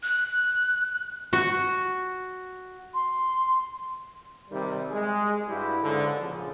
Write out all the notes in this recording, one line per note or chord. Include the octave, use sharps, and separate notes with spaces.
F#6
F#4
C6
C3 D#3 G3
G#3 G#4
G2 G3 E4 F#4 G4
C#2 G#2 D3
A#1 C#3 F3